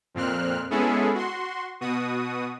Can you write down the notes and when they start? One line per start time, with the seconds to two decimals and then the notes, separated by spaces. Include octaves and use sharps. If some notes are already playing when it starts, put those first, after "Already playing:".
0.14 F2 A#2 C4 F6 F#6
0.71 G#3 B3 C#4 E4 G#4 A4
1.14 F#4 C6
1.81 B2 F#4 D#6